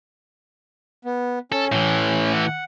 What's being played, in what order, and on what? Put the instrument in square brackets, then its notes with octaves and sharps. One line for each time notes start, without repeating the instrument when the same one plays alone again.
[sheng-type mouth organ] B3
[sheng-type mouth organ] C#4 [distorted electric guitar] A4
[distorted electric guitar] A2 E3
[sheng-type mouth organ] F#5